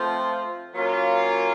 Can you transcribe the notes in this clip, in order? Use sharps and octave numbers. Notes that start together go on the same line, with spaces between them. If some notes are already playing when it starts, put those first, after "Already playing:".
Already playing: F3 A3 C4 F4
F#3 A#3 C#4 F4